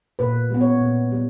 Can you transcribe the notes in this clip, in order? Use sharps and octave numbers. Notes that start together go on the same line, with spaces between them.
A#2 B4
G3 B3
C#5
A#2
G3 B3